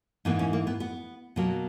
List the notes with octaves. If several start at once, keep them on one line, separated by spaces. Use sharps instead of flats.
G#2 E3 A#3 B3
C#4
A#3
B3
B3
B2 F#3 A#3